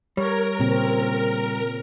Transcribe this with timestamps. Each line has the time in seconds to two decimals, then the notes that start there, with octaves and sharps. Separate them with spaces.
0.17 G3 A#4 C#5
0.60 A#2 C#3 C4